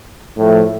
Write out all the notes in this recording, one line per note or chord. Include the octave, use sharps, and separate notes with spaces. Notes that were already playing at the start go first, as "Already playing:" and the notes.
A2 F3 A3